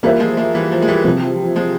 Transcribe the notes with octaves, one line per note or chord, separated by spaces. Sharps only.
E3 G3 A#3 F4 C5 E5
F3 G#3
F3 G#3
E3 G3
F3
G#3
E3 G3
C3 F3 C4
F3 G#3